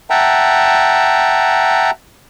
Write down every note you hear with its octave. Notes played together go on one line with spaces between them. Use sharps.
E5 F#5 G5 A5 A#5